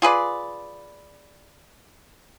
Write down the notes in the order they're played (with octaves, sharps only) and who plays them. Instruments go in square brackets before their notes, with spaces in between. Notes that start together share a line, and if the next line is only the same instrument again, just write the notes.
[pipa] F4 G#4 B4 D5